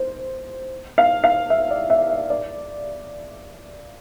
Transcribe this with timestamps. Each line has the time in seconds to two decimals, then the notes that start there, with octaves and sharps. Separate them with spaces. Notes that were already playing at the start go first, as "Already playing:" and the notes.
Already playing: C5
0.98 F5
1.24 F5
1.50 E5
1.71 D5
1.90 E5
2.10 E5
2.30 D5